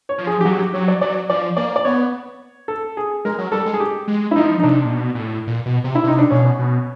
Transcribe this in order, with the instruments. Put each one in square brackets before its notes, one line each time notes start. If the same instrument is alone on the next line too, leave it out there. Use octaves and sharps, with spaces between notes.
[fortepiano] C#5
[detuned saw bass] F3
[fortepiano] G#4
G4
[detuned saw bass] F#3 [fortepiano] F#4
[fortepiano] G4
[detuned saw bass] F#3 [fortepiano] C#5
[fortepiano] D5
[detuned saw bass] F#3 [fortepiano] D5
[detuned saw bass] F3 [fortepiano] D5
[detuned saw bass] A#3 [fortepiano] D5
[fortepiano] D5
[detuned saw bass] B3 [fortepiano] C#5
[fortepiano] A4
G#4
[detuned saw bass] G#3 [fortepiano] A#4
[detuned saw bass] F#3
[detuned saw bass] G3 [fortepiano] A4
[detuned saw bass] G#3
[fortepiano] G#4
G4
[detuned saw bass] G#3
[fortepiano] E4
[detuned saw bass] F3 [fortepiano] D#4
[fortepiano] D#4
[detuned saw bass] C3 [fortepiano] D4
[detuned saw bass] A#2
B2
A#2
A2
A#2
B2
C3
[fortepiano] E4
[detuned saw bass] C3 [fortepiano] D#4
[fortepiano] D4
[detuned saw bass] B2 [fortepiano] C#4
[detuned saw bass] B2